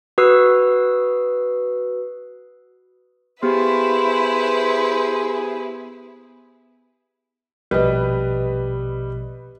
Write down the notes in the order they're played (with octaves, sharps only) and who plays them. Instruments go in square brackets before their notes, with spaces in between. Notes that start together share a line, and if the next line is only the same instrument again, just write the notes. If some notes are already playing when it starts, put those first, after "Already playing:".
[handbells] F#4 B4 D#6 E6 C7
[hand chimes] B3 G4 [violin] E4 B4 [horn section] G#4 [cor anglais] C5
[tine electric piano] A#1 B2 [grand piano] G3 [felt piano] B4 D#5